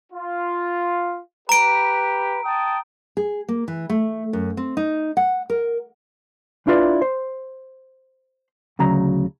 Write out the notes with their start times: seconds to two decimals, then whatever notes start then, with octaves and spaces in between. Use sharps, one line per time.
0.12 F4
1.49 G4 B4 A#5 D7
2.45 G5 A5 D#6
3.17 G#4
3.48 A#3
3.68 E3
3.90 A3
4.33 F#2
4.57 C4
4.77 D#4
5.17 F#5
5.50 A#4
6.67 D4 E4 F4 B4 D5
7.02 C5
8.79 D2 C#3 F#3 A#5